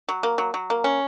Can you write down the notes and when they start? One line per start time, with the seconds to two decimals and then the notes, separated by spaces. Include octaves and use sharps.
0.09 F#3
0.23 A#3
0.38 F#3
0.54 F#3
0.70 A#3
0.84 C#4